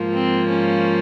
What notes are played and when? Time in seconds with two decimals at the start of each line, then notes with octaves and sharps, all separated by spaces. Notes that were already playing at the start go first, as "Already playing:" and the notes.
Already playing: G#2 F3 A#3
0.13 C4
0.49 C#4